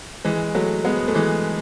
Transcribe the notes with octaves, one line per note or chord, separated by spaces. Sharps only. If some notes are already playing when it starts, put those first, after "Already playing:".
E3 G#3
F#3 A3
G#3 B3
A3
E3 G#3